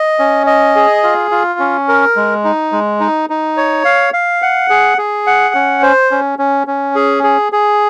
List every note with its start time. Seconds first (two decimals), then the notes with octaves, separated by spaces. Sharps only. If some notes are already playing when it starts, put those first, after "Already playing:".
Already playing: D#5
0.19 C#4
0.47 D#5
0.76 G#4
1.04 F4
1.31 F4
1.59 C#4
1.89 A#4
2.16 G#3
2.44 D#4
2.72 G#3
3.00 D#4
3.30 D#4
3.57 C#5
3.85 F5
4.13 F5
4.42 F#5
4.70 G#4
4.98 G#4
5.27 F#5
5.55 C#4
5.83 C5
6.11 C#4
6.39 C#4
6.67 C#4
6.95 G#4
7.24 G#4
7.52 G#4